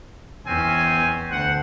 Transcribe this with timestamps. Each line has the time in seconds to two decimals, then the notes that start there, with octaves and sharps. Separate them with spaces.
0.47 E2 C4 C#4 G#5
1.30 D2 C5 F#5